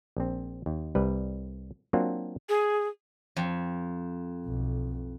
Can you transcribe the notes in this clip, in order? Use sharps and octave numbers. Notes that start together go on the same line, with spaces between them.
A#1 C4
D#2
C2 G3 B4
F#3 A#3 C4 D4 F4 F#4
G#4
F2
B1